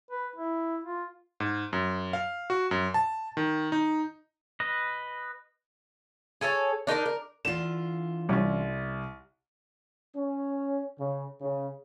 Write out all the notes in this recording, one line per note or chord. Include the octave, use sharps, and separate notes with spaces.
B4
E4
F4
G#2
F#2
F5
F#4
F#2
A5
D#3
D#4
B4 D#5
G#4 A4 C#5 G#5
D4 D#4 A4 A#4
A#4
D3 E3 F4 E7
C2 G3 C#4
C#4
C#3
C#3